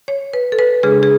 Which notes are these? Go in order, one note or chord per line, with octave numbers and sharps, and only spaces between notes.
C#5
B4
A4
B4
C#3 G#3 D4 G#4
G#4